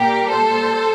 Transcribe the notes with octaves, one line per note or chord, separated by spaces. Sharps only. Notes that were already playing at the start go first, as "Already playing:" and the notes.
Already playing: A#2 G3 G4 A#4
A4 C5